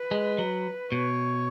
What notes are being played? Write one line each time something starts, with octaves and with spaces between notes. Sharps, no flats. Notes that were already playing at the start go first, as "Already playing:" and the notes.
Already playing: B4
G#3
F#3
B2 C#5